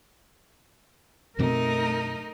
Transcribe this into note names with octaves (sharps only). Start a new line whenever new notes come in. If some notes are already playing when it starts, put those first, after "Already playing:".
F#2 B2 A3 C4 D#4 A#4